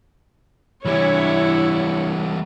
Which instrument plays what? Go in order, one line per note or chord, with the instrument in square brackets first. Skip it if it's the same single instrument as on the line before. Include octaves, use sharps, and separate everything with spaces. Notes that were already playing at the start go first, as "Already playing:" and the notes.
[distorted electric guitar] E3 G3 [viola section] D4 E4 C#5